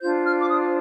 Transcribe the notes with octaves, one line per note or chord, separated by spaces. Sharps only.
D4 F4 C5 G6
F6
D6
D#6